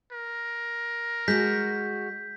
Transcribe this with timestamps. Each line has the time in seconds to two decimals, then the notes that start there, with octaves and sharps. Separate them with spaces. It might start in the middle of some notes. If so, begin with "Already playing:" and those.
0.12 A#4
1.28 G#3 F#4 G6 B6